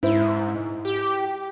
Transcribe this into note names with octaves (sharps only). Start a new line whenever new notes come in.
G#2 E4 C5
G4